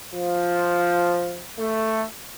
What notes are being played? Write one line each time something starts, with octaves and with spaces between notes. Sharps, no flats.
F3
A3